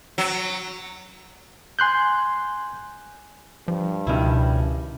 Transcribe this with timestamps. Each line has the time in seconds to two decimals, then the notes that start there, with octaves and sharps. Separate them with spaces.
0.18 F#3
1.79 G#5 C6 F#6 G6
3.68 G2 F3
4.07 C#2 B2 D#3 C#4 E4